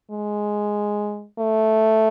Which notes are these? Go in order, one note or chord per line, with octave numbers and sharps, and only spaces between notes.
G#3
A3